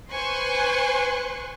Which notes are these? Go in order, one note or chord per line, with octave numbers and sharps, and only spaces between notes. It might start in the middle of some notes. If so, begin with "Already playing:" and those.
B4 C5 G#5 C6 C#6 F#6